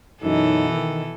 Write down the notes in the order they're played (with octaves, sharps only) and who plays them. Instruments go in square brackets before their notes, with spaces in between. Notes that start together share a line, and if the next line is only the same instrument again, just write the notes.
[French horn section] F#2 D#4 [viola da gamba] B2 E3 A4
[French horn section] D#3